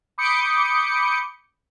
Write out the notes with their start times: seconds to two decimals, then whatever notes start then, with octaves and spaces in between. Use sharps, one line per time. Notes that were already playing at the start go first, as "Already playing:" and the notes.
0.18 B5 D6 D#6 G6 C#7